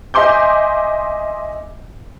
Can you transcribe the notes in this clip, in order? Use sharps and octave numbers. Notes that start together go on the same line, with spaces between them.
D#5 E5 G#5 C6 D6 G6